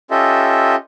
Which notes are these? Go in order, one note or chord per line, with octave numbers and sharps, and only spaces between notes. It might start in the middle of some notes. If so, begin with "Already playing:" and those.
C#4 F4 G4 A4 D#5 E5